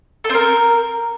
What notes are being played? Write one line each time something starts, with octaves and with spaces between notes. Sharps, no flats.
A4
C4
A#4